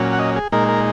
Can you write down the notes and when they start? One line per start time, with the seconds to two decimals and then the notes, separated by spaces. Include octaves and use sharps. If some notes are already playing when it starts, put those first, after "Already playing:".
Already playing: A#2 F#3 C#4
0.13 F#5
0.19 D#5
0.36 G#4
0.52 A#2 G#3 D#4 A#4
0.69 A#4